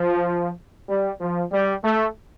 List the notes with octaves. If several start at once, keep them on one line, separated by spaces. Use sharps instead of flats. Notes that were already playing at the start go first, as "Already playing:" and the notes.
Already playing: F3
G3
F3
G3
A3